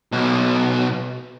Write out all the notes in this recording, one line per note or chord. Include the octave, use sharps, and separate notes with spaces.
B1 B2